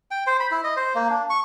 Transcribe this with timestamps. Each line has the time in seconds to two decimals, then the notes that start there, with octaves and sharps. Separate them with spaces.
0.11 G5
0.27 C5
0.40 B5
0.51 E4
0.64 D#5
0.76 C5
0.95 A#3
1.10 D4
1.30 C#6